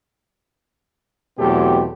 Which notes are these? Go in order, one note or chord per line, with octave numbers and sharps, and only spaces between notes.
E2 B2 F#3 A3 C4 G4